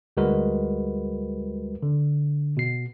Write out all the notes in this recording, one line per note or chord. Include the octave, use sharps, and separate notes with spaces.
D2 G3 G#3 F#4 A#4 B4
D3
B2 C7